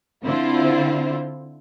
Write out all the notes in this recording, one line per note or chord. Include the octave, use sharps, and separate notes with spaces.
D3 C4 E4 F4 C5